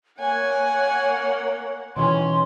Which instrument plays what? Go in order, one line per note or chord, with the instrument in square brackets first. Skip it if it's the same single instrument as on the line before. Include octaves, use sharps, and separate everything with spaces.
[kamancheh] A#3 F#5 [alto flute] C#5 [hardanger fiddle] G#5
[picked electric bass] B2 D#3 E3 [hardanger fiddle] C#4 [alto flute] C6